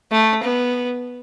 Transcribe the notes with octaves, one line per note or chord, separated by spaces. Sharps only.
A3
B3